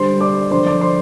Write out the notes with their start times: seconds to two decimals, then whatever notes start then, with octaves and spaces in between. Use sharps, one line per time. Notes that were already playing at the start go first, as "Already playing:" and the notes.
Already playing: D3 G3 C5 C6
0.21 D5 D6
0.51 D3 F3 C5 C6
0.66 D5 D6
0.81 C5 C6